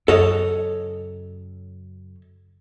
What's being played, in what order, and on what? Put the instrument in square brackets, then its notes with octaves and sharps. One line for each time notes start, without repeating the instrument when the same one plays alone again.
[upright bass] F#2 C#3 [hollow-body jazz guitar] A4 C#5 D#5